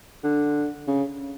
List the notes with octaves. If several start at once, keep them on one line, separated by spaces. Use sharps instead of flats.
D3
C#3